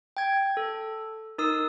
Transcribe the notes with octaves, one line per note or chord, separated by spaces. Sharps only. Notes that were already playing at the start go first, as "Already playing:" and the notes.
G5 G#6
A4
D#4 A#4 D#6 E6